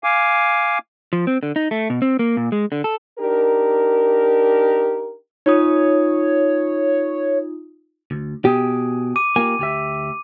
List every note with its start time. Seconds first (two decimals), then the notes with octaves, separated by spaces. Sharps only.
0.04 F5 G#5 D6
1.13 F3
1.27 C4
1.43 D3
1.56 D#4
1.71 A3
1.90 B2
2.02 C4
2.19 A#3
2.37 A#2
2.52 G#3
2.72 D3
2.84 A4
3.19 D4 D#4 G4 A#4
5.46 D#4 F4 C#5 D#6
8.11 D2
8.45 B2 G4 G#4
9.16 D6 D#7
9.36 A#3 F4 G4 G#5
9.59 D2 G4 E5